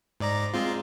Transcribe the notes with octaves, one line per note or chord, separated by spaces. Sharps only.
G#2 D5 A#5
G#3 C4 F4